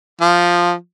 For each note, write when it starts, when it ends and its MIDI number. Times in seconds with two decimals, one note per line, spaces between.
0.21 0.73 53